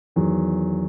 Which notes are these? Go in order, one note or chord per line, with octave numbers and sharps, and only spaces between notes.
E2 D#3 F#3